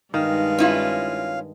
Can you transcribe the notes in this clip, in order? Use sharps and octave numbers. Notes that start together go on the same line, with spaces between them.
G2 D#3 G#3 F5
C#4 E4 F4